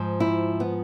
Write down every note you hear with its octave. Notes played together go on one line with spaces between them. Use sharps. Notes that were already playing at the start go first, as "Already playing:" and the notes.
Already playing: G#2 F3
E4
B3